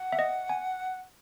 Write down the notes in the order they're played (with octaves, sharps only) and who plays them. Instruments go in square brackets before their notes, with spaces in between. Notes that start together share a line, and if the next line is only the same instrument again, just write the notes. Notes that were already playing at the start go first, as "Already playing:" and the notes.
Already playing: [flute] F#5
[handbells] E5
D#5
G#5